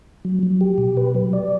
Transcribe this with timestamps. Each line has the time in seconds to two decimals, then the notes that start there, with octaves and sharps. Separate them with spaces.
0.25 F#3
0.43 F#3
0.61 G4
0.78 B2
0.97 B4
1.14 F#3
1.33 D5